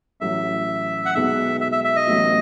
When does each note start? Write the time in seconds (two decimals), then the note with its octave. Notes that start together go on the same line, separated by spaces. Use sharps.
0.21 A1 A2 F#3 E5
1.05 F#5
1.15 B1 B2 G#3 D#4 E5
1.61 E5
1.72 E5
1.84 E5
1.96 D#5
2.07 A1 A2 F#3 B3 F#4